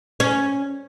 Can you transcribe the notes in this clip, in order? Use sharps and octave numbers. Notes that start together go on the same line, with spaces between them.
C#4